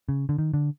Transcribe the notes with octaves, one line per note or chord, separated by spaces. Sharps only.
C#3
D3
D#3
D3